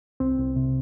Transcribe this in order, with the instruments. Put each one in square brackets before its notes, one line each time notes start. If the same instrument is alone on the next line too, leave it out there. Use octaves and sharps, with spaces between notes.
[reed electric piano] C2 C4
C2
C3